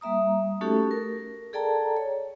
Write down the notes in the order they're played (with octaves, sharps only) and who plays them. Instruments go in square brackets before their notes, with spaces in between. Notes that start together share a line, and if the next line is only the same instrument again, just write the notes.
[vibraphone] G3 A#3 E5 A#5 D#6
A3 C#4 D#4 F#4 G4 A4
A#4
G#4 A4 D5 G5 A5 A#5
C#5